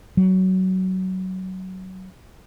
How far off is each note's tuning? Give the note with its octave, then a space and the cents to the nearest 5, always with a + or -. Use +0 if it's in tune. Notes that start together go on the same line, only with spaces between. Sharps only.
F#3 +15